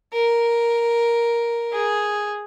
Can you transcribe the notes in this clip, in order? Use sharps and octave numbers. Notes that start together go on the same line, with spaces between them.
A#4
G#4